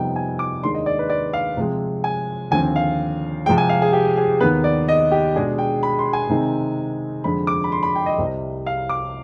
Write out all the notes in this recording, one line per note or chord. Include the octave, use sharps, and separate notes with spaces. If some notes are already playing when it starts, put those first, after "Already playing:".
Already playing: F2 C3 G3 B3 D#4 G5
G#5
D6
D#2 D#3 G#3 D4 C6
D#5
D5
B4
D5
F5
C3 F3 G#3 C4
G#5
D#2 D3 F3 C4 G#5
F5
C3 F3 G#3 G5
G#5
F5
G#4
G4
G#4
D#2 D#3 B3 B4
D5
D#5
G4
B2 G#3 D4 G#4
G5
B5
C6
G#5
C3 D#3 G#3 C4 D#4
F2 D3 G#3 B5
D6
B5
C6
B5
G5
D#5
C2 C3 G3
F5
D6